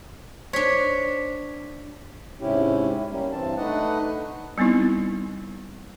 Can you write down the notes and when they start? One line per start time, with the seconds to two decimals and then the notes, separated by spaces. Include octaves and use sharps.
0.53 D4 C5 C#5 B6
2.40 G#2 C3 C#4 E4 G4
3.10 G3 A#3 C#4 G4
3.32 G2 E3 C4 A5
3.57 A3 D4 D#4 B4 D#5 F#5
4.58 G3 B3 C4 D#4 E4